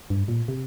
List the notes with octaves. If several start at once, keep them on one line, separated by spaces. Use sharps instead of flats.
G2
A#2
C3